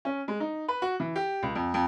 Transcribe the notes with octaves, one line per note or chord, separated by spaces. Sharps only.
C#4
G#3
D#4
B4
F#4
E3
G4
C#2
F2
F2